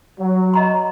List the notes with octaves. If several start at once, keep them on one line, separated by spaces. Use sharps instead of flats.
F#3
D#5 A#5 C6